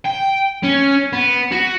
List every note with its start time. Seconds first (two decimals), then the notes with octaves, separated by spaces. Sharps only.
0.05 G5
0.64 C#4
1.13 B3
1.52 F#4